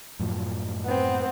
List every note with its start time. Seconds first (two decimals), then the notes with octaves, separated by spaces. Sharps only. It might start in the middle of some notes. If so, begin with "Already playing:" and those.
0.19 F#2 A2 F3
0.85 B3 C4